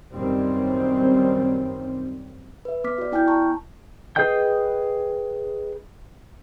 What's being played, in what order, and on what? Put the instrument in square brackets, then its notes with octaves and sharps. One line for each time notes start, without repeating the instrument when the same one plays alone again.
[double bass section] F#2 D#3 G3 C4
[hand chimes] B4 E5
B3 D6 F6 B6
F#4 D5
B3 E4 G5 G#5 F6 G6
A5 A#5 C#6
[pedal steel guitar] G#4 B4 D#5 G5 G6